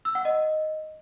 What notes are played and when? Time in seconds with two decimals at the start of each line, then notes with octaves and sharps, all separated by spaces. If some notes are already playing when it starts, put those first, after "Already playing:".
0.05 E6
0.15 F#5
0.25 D#5